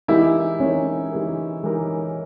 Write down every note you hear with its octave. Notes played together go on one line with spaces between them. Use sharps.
E3 G#3 D#4 E4 G4 A#4
E3 G#3 C#4 D#4 G4 A#4
E3 G#3 D#4 G4 A#4
E3 G#3 D#4 G4 A#4